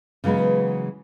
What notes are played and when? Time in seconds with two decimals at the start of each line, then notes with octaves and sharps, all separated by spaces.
0.24 C#3 E3 F#3 G#3 B3